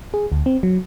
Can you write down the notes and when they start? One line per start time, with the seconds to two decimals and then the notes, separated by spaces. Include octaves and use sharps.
0.14 G#4
0.32 D2
0.46 C4
0.63 F#3